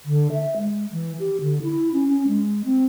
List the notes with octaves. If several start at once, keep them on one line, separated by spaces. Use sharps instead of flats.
D3
E5
G#3
E3
G4
D3
E4
C#4
C#4
G#3
C4